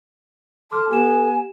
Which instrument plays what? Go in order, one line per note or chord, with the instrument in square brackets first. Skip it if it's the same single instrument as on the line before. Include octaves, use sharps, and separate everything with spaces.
[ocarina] A4 [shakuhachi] A5 [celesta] C6 D6 F6
[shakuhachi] B3 [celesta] G4 E7 [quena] G#5